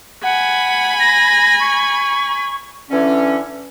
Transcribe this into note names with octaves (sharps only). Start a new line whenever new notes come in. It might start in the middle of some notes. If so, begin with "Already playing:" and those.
F#5 G#5 B5
A#6
C#6
D3 E3 C#4